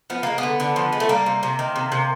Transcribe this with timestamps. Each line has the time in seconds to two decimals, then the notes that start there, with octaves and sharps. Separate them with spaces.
0.10 F3 B3
0.23 G#3 A#3
0.38 B3
0.43 D3
0.60 D3
0.76 F3
0.92 G#3
1.00 A3
1.09 G3 A#3
1.26 C3
1.43 C3
1.59 D#3
1.76 C3
1.92 C3